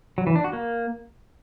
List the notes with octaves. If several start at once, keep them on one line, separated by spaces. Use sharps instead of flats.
F#3
E3
D4
F#4
A#3